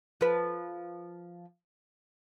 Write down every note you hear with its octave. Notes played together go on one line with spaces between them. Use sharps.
F3 B4